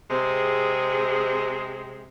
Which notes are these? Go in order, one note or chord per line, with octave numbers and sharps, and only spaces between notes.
C3 G#3 C4 G#4